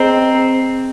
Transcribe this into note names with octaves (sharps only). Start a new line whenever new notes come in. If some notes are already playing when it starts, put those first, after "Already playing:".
Already playing: C4 G#4 C5 D#5 A#5